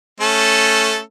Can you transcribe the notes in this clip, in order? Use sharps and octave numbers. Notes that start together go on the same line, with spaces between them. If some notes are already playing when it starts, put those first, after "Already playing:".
A3 C#4 A4